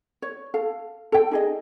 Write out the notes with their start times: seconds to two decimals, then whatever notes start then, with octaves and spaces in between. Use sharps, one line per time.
0.22 C#5
0.54 A4 F5
1.12 A4 G5
1.31 D#4 G#4 D#5